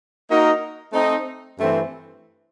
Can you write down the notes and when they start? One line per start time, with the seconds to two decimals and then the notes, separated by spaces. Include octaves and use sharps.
0.29 A#3 D#4 F#4 A#4 D#5
0.93 A3 C4 D#4
1.58 G2 E3 A3 C4